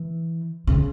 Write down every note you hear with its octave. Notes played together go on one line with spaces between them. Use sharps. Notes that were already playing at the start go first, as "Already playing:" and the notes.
Already playing: E3
C#3